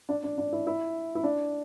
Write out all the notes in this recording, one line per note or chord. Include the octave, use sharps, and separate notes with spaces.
D4
D4
D4
E4
E4
E4
D4